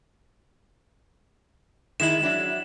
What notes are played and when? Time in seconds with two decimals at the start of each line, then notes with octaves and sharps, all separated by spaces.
2.00 D#3 G#3 E4 E7 F#7
2.23 F#3 D4 E5